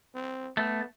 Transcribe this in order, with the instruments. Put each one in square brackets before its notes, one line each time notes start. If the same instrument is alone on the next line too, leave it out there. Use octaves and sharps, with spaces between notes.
[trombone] C4
[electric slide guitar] A3 [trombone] B3